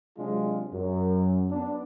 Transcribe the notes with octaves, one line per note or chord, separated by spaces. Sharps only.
C3 F#3 G#3 D4 F4
F#2
B3 D4